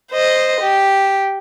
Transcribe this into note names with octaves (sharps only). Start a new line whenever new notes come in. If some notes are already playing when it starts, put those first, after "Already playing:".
C5 D#5
G4